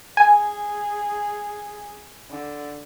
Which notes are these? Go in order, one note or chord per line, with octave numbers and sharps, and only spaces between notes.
G#4 G#5
D3